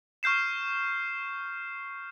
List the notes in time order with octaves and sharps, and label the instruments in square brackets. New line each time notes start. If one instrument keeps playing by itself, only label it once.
[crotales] C#6 F6 G6 C7 E7